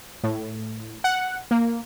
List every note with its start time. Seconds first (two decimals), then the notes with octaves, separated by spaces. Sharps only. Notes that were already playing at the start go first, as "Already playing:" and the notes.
0.23 A2
1.04 F#5
1.51 A#3